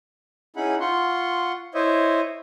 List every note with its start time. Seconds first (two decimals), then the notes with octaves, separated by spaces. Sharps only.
0.56 C#4 D#4 E4 G#4 F#5 B5
0.80 F4 F#5 C6 C#6
1.74 E4 C5 C#5 D#5 E5